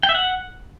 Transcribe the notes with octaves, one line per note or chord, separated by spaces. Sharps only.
G5
E5
F#5